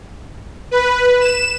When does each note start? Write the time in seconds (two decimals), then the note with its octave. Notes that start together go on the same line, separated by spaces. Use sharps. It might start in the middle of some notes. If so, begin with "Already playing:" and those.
0.71 B4
1.21 E7